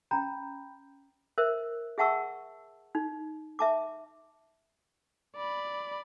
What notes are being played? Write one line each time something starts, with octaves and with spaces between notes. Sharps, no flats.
C#4 G5 A#5 B5 G6
A#4 C5 E5
G#4 E5 F#5 A5 C#6 E6
D#4
E5 A5 D6
D5 B5